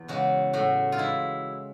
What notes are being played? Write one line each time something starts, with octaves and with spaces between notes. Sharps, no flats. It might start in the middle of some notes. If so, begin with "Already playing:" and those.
Already playing: E2
C#3 E3 G#3 F#4
A2 F#4
F4
E3 G#3 E4